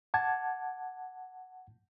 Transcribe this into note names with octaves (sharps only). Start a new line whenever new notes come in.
F#5 A5 D6 G#6